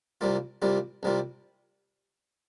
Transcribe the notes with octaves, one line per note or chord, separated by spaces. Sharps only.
C2 C3 G3 A#3 F4
C2 C3 G3 A#3 F4
C2 C3 G3 A#3 F4